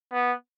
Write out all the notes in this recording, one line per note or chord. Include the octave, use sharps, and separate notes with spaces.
B3